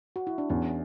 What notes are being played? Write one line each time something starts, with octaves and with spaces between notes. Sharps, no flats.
F#4
E4
D4
E2 C#4